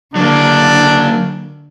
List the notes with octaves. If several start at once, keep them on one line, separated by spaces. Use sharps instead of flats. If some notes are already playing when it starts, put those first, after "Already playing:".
D3 F#3 A#3 D4